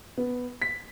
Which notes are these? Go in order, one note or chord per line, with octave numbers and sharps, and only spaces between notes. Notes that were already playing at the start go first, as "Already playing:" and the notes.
B3
B6